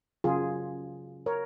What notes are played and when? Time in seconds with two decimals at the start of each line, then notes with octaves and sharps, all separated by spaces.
0.24 C#3 F#3 C#4 F4 G#4
1.26 A#4 C#5